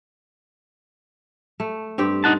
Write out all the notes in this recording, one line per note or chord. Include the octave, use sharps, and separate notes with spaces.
A3
G2 C4 G4
D#4 F#5 A5